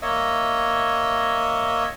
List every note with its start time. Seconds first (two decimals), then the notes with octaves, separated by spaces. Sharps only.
0.02 A#3 C#5 D#5 E5